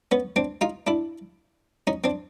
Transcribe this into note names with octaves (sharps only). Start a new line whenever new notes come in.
B3 C#4
C4 D4
D#4 F4
D4 E4
C#4 D#4
C4 D4